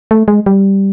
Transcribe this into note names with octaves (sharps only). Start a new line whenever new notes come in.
A3
G#3
G3